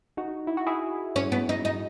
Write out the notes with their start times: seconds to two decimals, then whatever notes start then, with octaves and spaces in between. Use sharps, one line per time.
0.17 D#4 F#4
0.47 E4
0.57 F#4
0.67 E4 G#4
1.16 C#4
1.32 B3
1.49 D#4
1.65 D#4